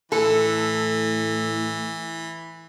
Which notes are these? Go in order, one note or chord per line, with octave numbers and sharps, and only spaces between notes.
A2 E3 A4